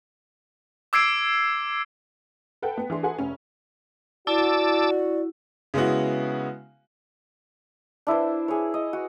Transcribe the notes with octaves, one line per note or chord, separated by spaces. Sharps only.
D6 E6 G#6 C7 D7
A4 B4 F#5 G5 A5
B3
E3 D4 G#4 C6
F#4 G#4 A4 B4 F#5 G#5
F1 C#4
E4 F#4 D5 A5 D6 E6
C#3 G#3 B3 E4 F#4
D4 E4 B4 C5
G#4 C#5
D#5
F#4